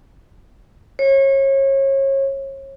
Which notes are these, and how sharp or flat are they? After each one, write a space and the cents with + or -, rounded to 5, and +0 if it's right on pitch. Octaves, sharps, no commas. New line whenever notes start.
C#5 -30